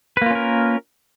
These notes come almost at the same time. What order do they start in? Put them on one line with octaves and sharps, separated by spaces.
B4 A#3 F4 C#4 A#4